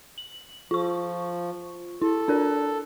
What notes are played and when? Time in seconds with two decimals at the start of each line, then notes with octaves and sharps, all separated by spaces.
0.18 F#7
0.71 F3 F4 C#6
2.02 E4 A4
2.28 D4 A#4 D5